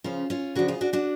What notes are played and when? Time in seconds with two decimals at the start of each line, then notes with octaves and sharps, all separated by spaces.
0.04 C#3 F3 C#4 F4
0.30 C#4 F4
0.55 C#3 F3 D4 F#4
0.68 F4 G#4
0.81 D4 F#4
0.93 D4 F#4